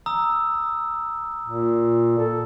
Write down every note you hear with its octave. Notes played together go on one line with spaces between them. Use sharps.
A#5 D#6 E6
A#2
A4